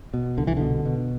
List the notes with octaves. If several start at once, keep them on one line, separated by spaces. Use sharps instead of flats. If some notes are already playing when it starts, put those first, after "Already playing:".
B2
C2 D3
E3
B2 D3
B2